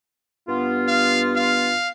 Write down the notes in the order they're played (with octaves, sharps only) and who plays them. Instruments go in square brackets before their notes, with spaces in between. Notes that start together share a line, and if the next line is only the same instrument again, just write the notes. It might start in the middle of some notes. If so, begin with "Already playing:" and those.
[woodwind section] G2 B3 F4
[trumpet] F5
F5